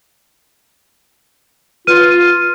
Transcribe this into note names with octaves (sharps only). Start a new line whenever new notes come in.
F4 B4 F6 D#7